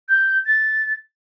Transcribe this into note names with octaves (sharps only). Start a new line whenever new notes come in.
G6
A6